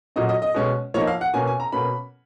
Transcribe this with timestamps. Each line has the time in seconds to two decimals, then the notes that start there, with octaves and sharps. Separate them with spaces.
0.16 A#2 F#3 C#4 D#5
0.29 D#5
0.42 D#5
0.54 B2 G#3 C#4
0.94 F3 A#3 D#4 C#5
1.07 F5
1.21 F#5
1.33 B2 A#3 C#4 G#5
1.47 G#5
1.60 A#5
1.72 B2 A#3 C#4 B5